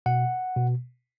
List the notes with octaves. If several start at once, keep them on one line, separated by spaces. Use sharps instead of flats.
B2 F#5
B2